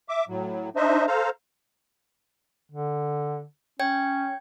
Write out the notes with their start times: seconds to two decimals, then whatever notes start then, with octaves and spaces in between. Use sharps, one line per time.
0.09 E5 D6
0.29 A2 F#3
0.76 D4 D#4 C5 D#5 E5
1.07 A4 C5 F5 A#5
2.72 D3
3.80 C#4 C#5 G5 G#6